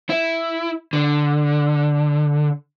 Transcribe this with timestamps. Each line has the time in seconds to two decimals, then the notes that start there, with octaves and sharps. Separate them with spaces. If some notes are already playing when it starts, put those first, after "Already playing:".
0.10 E4
0.93 D3